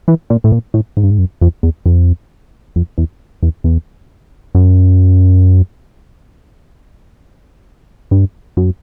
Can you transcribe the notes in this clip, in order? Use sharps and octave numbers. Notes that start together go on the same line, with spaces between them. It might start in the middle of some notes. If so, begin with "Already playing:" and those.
E3
A#2
A2
A#2
A2
G#2
G2
G#2
F#2
F2
E2
F2
F2
E2
E2
E2
F#2
G2
F#2